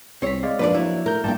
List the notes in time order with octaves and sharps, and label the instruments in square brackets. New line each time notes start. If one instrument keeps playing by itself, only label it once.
[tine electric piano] C2 B6 [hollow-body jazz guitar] C4 C#5
[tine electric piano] G#3 D5 F5
[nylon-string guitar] F#2 D4 [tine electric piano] F3 A#3 [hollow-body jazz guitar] B4 D5
[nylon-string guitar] F#3 [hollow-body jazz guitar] E4
[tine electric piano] A3 G6 [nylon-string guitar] A#4
[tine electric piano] A1 A5 [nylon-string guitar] G2 A#3 G5